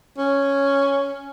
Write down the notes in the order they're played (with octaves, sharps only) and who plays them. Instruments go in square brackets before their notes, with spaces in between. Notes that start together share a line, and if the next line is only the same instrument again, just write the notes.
[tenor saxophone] C#4